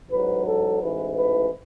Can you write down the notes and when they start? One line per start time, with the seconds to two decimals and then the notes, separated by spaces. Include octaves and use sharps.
0.10 A1 G#2 F#3 B4
0.46 A4
0.80 A1 G#2 E3 B4
1.15 B4